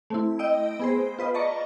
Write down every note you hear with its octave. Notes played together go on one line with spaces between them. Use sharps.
A3 C4 E4
D#5 G5 E6 D7
B3 G#4 C5
F4 B4 D#5
D5 D#5 A5 A#5 C#6